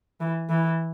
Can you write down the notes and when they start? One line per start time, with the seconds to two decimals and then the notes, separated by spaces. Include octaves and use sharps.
0.21 E3
0.50 E3